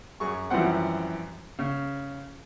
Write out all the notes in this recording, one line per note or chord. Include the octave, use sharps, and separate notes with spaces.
F#2 G#4 C#6
F#2 E3 F3 G3 C4 F#5
C#3